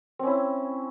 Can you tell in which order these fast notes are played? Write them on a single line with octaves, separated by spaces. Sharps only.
C4 C#4 E4